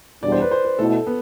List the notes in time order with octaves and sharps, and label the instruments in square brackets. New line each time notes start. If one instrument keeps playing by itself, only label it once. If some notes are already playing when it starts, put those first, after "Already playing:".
[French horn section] E2 B2 G3 D4 [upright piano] D5
[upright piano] C5
B4
C5
B4
[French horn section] B2 A3 E4 [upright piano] A4
[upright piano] B3